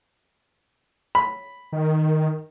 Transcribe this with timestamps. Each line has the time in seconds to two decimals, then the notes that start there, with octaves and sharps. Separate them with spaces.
1.15 B5
1.72 D#3